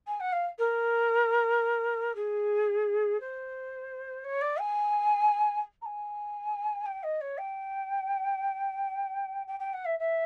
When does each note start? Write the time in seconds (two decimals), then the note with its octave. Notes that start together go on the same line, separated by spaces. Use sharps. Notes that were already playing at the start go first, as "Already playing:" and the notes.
0.07 G#5
0.20 F#5
0.32 F5
0.58 A#4
2.15 G#4
3.20 C5
4.24 C#5
4.41 D5
4.59 G#5
5.81 A#5
5.85 G#5
6.85 G5
7.03 D#5
7.20 C#5
7.37 G5
9.47 G5
9.59 G5
9.73 F#5
9.85 E5
9.99 E5